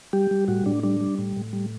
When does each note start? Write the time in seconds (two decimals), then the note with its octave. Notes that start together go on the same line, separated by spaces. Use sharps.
0.13 G3 G4
0.31 G3
0.48 A2 F#4
0.66 A2 D4
0.83 G3 D4
1.01 G3
1.19 A2
1.36 A2
1.53 G3